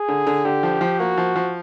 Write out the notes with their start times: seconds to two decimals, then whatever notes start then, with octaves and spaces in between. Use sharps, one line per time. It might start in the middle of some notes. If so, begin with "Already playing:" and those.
Already playing: G#4
0.08 D3
0.27 D3
0.45 D3 G4
0.63 F3
0.81 F3
0.99 A#3 F#4
1.18 F3
1.36 F3